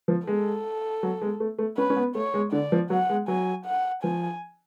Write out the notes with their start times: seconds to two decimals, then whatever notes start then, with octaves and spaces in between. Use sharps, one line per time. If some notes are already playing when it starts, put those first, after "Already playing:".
0.08 F3
0.27 G#3 A4
1.03 F#3
1.22 G#3
1.40 A3
1.58 A3
1.77 C#4 B4
1.90 C#4
1.97 B3
2.15 A3 C#5
2.34 G#3
2.52 D3 D5
2.72 F3
2.90 F#3 F#5
3.10 G#3
3.28 F#3 G#5
3.66 F#5
4.03 F3 G#5